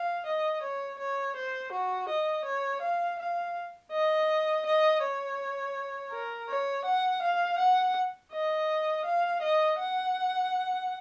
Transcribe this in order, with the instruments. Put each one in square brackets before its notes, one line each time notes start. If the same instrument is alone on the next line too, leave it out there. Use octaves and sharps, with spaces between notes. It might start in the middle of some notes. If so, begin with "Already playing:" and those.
Already playing: [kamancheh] F5
D#5
C#5
C#5
C5
F#4
D#5
C#5
F5
F5
D#5
D#5
C#5
A#4
C#5
F#5
F5
F#5
D#5
F5
D#5
F#5